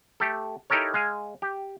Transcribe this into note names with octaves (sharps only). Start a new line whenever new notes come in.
A3 G4 A4
D#4 E4 G4 A4 A#4 C#5
G#3 F5 G#5
G4